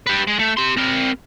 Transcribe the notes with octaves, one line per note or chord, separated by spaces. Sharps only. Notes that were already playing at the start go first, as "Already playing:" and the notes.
G4 B4
G#3
A3
G4 C6
C4 A#4